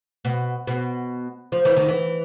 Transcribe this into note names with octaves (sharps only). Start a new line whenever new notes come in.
B2
B2
F3
E3
D#3
E3